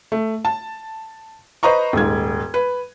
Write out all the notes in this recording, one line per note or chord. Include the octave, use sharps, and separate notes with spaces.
A3
A5
B4 C5 D#5 A#5 C#6
D#1 G#2 G#6
B4